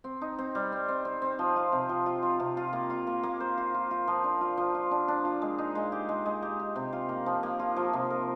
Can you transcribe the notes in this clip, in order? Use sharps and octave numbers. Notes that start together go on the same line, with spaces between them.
C4
D#4
C4
G3
C4
C4
C4
C4
F3
F4
C3
F3
F4
F4
C3
F4
A#3
F4
A#3
A#3
C5
F4
F4
F4
F3
D4
F4
F3
F4
D4
D4
F4
G#3
D#4
G#3
G4
G#3
G#3
G4
G4
C3
F4
A#3
F3
A#3
F4
F3
C3
A#4